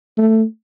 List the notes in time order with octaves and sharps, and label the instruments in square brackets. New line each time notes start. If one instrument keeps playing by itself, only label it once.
[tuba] A3